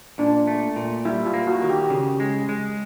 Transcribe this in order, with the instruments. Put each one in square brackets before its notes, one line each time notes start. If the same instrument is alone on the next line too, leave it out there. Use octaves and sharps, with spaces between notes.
[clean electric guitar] A#2 [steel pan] D4
[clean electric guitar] A3
A#2
[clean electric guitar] G3 [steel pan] E4
[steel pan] F4
[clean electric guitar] A#3
[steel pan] F#4
[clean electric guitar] D#3
[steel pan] G4
[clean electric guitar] C#3
G#3
G#3